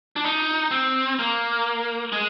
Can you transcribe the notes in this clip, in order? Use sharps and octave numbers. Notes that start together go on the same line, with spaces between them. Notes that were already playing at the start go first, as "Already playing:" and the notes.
D4
D#4
C4
A#3
G#3